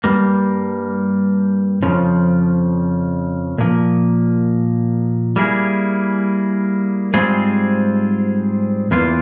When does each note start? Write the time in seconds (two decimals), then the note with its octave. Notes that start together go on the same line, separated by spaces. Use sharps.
0.04 G2 G3 A#3
1.82 F2 C#3 F3
3.58 A#2 F3 A#3
5.36 G3 A#3 E4 G#4
7.14 G#2 G3 C4 F4 G#4
8.91 E2 E3 A#3 F4